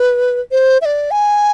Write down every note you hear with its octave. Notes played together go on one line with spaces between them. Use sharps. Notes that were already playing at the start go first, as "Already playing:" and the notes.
Already playing: B4
C5
E5
D5
G#5